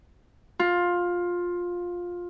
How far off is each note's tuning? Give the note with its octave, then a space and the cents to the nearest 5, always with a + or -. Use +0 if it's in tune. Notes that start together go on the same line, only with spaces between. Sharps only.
F4 +15